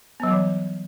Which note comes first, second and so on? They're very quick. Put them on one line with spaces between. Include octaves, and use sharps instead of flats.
B3 F#3 G3 E3